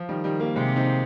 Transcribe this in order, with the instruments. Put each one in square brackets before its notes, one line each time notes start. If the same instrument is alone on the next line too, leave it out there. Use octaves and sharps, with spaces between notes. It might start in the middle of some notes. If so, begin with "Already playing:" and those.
Already playing: [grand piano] F3
D#3 G3
D#3 G3
G3 A#3
[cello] C3 [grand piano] G#3 C4
[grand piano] C4 D#4